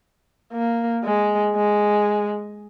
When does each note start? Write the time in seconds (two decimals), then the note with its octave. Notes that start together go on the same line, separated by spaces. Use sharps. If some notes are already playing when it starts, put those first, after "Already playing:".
0.53 A#3
1.04 G#3
1.55 G#3